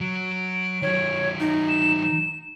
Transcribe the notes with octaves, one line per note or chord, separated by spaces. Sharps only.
F#3 D7
D#3 F#3 C#5
D#4
E7
E7